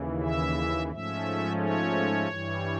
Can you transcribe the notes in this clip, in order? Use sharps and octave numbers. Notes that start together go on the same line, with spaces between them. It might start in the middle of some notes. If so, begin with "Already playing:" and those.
Already playing: D#2 C#3 E3
E5
G#2 F3 A3 C#4 E5
C#5
G2 E3 G3